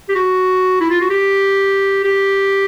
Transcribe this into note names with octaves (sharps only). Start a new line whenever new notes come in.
G4
F#4
E4
F4
F#4
G4
G4